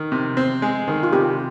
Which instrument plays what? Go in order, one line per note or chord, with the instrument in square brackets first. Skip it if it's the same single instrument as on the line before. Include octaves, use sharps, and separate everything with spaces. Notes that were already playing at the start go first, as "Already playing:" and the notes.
Already playing: [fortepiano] D#3
C3
C4
G#3
D#3
[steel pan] F4
[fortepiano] C3 [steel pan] G4